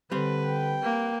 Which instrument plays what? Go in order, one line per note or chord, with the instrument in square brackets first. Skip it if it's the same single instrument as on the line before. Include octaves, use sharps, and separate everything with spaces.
[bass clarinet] D3 [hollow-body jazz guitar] G3 C4 [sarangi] B4
[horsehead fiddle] G5
[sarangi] A#3